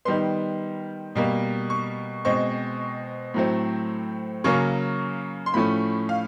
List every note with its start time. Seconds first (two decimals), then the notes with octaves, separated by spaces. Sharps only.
0.05 D#3 G3 B3 C6
1.15 B2 G3 A#3
1.70 C#6
2.25 B2 G#3 C4 C#6
3.34 A2 F#3 A3 C4
4.44 C#3 F#3 A#3 C#4 C#6
5.46 C6
5.54 A2 F3 A3 C#4 B5
6.09 F5